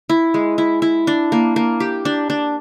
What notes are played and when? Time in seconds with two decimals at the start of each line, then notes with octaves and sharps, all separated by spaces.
0.09 E4
0.34 G#3
0.58 E4
0.82 E4
1.07 D4
1.32 A#3
1.56 A#3
1.80 G4
2.05 D4
2.30 D4